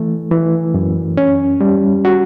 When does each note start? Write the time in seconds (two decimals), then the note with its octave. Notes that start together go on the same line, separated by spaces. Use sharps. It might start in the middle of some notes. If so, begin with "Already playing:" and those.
Already playing: E3 A3
0.32 E3
0.74 F#2
1.17 C#4
1.61 G3
2.05 F#4